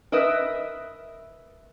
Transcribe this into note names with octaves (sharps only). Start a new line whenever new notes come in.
A#4 B4 D#5 E5